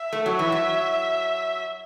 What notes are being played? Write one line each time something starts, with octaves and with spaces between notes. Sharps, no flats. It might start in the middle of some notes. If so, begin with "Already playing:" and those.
Already playing: E5
A3
F#3
E3 E5
F#3